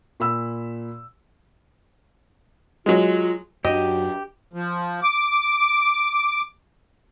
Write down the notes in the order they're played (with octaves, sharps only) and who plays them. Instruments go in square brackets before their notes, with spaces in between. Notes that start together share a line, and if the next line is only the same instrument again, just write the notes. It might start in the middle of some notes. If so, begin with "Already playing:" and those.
[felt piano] A#2 B5 E6
[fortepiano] F#3 G#3 [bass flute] F4
[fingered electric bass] F#2 D4 [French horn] F#3 [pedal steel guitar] G4 [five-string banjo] D#5
[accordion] F3
D6